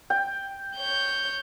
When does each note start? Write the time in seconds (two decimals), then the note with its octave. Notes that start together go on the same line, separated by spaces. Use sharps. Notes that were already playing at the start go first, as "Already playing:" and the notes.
0.10 G5
0.76 C#5 G6